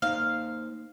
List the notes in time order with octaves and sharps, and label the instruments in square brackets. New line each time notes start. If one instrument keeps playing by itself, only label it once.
[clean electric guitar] A#3 D#4 C5 [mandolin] F5